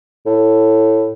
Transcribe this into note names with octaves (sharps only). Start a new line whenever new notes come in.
A2